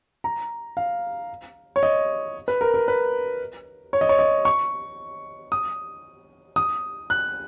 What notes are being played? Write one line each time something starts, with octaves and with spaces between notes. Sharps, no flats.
A#5
F5
C#5
D#5
B4
A#4
A#4
B4
C#5
D#5
C#5
D#5
C#6
D#6
D#6
F#6